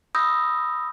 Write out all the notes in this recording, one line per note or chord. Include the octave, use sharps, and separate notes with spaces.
B5 D#6 E6 G6 A#6